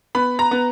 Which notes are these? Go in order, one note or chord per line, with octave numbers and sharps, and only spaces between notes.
B3 B5
A#5
B3